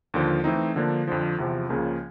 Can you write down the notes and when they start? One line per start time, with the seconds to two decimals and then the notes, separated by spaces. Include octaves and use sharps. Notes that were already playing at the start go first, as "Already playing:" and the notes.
0.14 D#2 D3 F3
0.44 E3 A3 C4 D#4
0.76 D3 F3 A#3 D4
1.07 F2 D3 F3
1.38 E2 C3 F3
1.69 C#2 C#3 F3 A#3 C#4